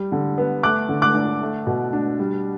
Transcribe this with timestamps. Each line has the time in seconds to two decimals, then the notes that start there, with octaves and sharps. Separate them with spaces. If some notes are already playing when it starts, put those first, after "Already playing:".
Already playing: G3
0.12 D3
0.38 B3
0.63 A3 D6 F#6
0.89 D3
1.02 D6 F#6
1.15 D4
1.42 A3
1.67 B2
1.93 D4
2.19 G3